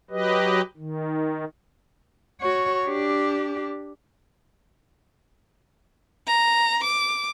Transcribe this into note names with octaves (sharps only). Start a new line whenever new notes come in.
F#3 G4 B4 D#5
D#3
F#4 C#5
D4 G4
A#5
D6